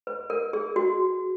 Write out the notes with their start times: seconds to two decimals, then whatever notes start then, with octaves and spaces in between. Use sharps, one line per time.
0.07 B4
0.30 A#4
0.53 G#4
0.76 F#4